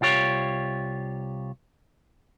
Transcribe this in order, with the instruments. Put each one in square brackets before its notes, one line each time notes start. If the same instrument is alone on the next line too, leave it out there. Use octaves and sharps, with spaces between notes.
[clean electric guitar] C2 F4 G4 C#5